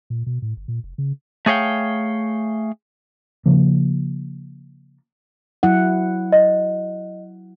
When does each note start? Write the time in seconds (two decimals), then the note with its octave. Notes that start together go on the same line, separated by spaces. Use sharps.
0.10 A#2
0.26 B2
0.42 A2
0.57 G1
0.68 A#2
0.84 F1
0.98 C#3
1.46 A3 G#4 C#5 F5 G5
3.46 C#3 F3 A#3
5.63 F#3 E4 F#5
6.32 D#5